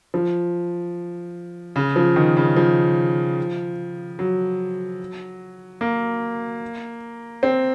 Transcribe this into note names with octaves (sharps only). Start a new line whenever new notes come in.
F3
C#3
F3
D#3
C#3
F3
F#3
A#3
C4